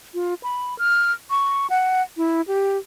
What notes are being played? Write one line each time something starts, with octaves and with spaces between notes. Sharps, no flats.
F4
B5
F6
C#6
F#5
E4
G4